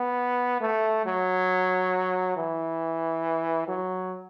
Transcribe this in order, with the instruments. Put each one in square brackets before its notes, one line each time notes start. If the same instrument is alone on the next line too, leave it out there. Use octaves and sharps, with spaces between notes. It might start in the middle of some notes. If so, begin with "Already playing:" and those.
Already playing: [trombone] B3
A3
F#3
E3
F#3